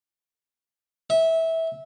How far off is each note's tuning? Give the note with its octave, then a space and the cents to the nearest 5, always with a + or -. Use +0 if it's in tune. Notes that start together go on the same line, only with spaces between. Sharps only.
E5 -20